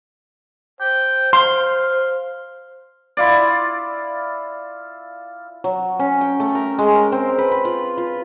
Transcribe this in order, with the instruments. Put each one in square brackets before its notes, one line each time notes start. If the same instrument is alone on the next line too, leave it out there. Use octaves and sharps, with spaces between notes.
[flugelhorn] C5 [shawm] G5
[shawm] F5 [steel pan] C6
[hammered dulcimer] E4 F4 D5
F#3
C#4
G5
A3
A#4
G#3
A#4
C4
B4
B5
F4
F4